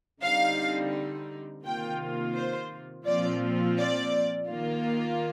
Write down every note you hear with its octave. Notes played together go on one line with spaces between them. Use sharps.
D3 G3 C4 D#4 F5
C3 D#3 A#3 F4 G5
C5
A#2 F3 C4 F4 D5
D5
D#3 A#3 F4